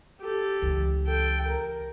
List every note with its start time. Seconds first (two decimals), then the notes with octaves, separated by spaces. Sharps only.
0.20 G4 A4
0.62 C#2 E3
1.06 A4 G5
1.47 A#4